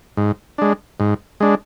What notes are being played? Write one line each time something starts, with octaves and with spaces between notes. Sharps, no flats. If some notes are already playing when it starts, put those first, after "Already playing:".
G#2
G#3 D4
G#2
G#3 D4